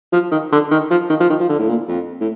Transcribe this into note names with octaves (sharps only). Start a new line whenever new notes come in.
F3
D#3
D3
D#3
F3
D#3
F3
D#3
F3
D3
A2
A#2
F2
A2